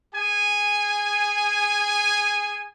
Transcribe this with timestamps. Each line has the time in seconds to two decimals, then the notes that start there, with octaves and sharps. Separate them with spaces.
0.14 G#4 G#5